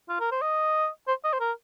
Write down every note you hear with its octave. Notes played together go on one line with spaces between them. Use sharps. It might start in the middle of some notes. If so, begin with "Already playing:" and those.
F4
A#4
C5
D#5
C5
D#5
C5
A#4